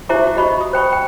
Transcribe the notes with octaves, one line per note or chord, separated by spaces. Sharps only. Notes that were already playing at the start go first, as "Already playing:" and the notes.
E4 G4 C5 E5 A#5 D6
F#4 D6
F#4 G4 D#5 B5 C#6
D#6
C5 G5 B5 C#6
G5